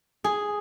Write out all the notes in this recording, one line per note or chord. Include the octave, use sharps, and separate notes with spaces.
G#4